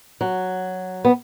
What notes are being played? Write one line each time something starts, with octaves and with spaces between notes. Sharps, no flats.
F#3
B3